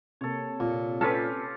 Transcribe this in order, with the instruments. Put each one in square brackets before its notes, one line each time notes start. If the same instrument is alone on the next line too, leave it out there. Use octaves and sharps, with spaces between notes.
[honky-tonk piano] C3 A#3 [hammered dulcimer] A4 C#5
[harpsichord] A#2
[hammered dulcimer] C#4 F4 G4 [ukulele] A4 B4